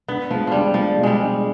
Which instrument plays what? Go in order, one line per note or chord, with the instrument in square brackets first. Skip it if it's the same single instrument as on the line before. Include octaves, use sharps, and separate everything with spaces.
[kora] B3 [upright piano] D4
[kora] F3 [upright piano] G#3
[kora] F3 G3 [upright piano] D4
[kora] F3 [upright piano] G#3
[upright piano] B2
[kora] G3 G#3
[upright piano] D4